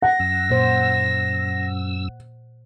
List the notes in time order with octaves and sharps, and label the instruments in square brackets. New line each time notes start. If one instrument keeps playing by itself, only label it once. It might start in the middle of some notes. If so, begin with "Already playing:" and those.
[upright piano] F#5 [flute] A#6
[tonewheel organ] F#2 E6
[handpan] A#2 C5